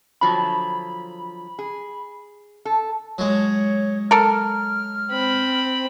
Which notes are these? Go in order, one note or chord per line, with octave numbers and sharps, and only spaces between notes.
D3 F3 F#3 B5
G#4
A4
F#3 G#3 C#5
A4 A#4 F6
C4 B5